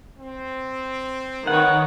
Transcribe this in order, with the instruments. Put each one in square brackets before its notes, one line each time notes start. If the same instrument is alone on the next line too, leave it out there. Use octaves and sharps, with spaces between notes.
[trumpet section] C4
[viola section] D#3 [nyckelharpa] B4 C#5 [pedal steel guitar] F#5